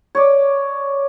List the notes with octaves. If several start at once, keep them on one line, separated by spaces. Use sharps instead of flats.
C#5 D5